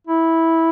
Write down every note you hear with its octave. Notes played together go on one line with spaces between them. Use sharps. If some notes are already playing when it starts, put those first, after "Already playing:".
E4